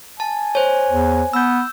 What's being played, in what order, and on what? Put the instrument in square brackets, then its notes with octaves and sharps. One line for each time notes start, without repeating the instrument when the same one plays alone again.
[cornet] G#5 [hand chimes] A5
[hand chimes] C5 C#5
[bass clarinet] E2
[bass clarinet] B3 [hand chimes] E6 G6